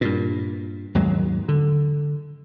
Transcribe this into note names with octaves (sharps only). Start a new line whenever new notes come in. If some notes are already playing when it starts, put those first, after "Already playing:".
G2 A#2
D#2 G#2 F#3 G#3
D3